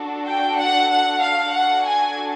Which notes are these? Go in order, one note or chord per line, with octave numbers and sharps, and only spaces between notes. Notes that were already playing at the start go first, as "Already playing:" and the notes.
Already playing: D4 F#4 A4
G5
F#5
F#5
F5
D4 F#4 A4 F#5
G#5